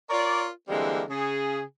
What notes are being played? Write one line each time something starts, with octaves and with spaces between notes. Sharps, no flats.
F4 A#4 C#5 D5
D3 E3 G3 G#3 A#3 C4
C#3 G#4